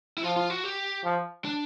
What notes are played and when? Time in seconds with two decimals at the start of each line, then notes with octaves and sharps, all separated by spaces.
0.18 E4
0.23 F3 F4
0.36 F4
0.50 F#4
0.64 G4
1.05 F3
1.45 D4